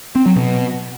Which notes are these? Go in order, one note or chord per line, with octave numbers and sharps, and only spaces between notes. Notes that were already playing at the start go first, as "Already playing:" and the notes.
C4
F#3
B2